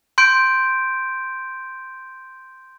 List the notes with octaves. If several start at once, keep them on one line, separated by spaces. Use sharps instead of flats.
C6 G6 D7